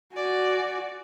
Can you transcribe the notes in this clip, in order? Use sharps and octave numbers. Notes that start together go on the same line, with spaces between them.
F#4 D5 G#5